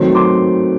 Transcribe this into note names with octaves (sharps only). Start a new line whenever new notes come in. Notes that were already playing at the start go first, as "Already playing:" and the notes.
Already playing: D#3 F#3 A3 C4
C6 D6